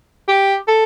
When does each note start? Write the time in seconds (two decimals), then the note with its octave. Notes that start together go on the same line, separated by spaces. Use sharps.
0.28 G4
0.68 A4